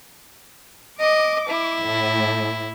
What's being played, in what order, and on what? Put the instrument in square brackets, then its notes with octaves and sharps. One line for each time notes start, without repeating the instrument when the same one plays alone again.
[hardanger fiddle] D#5 [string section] D6
[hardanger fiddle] E4
[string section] A2